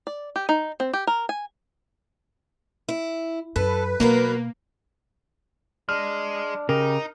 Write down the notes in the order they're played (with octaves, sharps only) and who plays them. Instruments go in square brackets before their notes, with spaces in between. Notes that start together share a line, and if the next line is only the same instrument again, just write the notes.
[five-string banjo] D5
G4
D#4
C4
G4
A#4
G#5
[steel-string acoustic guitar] E4
[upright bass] F#2 [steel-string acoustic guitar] A4 [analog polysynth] B4
[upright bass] B2 [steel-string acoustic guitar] F#3 B3 A#4 [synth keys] A#3
[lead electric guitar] G#3 [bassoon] D4 [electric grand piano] F6
[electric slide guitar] C#3 [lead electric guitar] D#4 [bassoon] G4 [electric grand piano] A#4